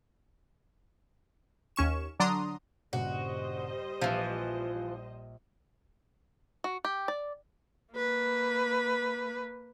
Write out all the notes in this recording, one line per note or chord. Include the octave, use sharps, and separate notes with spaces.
D#2 C#4 C#6 E7
D3 F#3 D4 A#5 C6 D#6
A#1 G2 C#3 G3 F#4 C5 D#5
A#1 E3 F3
F#4
G4
D5
A#3 B4